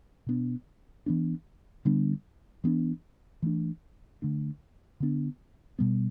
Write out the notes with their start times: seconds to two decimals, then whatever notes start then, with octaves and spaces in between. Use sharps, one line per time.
0.26 B2 B3 D4
1.06 E3 B3 D4
1.85 D3 G3 B3 D4
2.64 E3 B3 D4
3.42 E3 A3 D4
4.22 D3 A3 D4
5.00 D3 B3 D4
5.79 B2 G3 B3